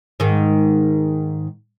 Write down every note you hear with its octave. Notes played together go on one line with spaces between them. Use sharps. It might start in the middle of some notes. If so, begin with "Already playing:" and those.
G#2 D#3